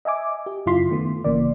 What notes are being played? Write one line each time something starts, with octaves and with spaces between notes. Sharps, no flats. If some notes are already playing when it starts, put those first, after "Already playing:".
D#5 E5 G#5 D6
G4
F#2 C#3 E4 F4 C6 B6
D#3 A3 B3
G1 C#3 E3 A#3 D5